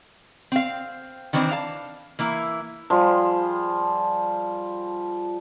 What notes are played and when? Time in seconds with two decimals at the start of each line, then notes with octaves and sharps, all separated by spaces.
0.52 C4 F5
1.33 D#3 E3 C4 D4
1.51 F5 A5
2.19 E3 A#3 E4
2.90 F3 G3 G#4 C6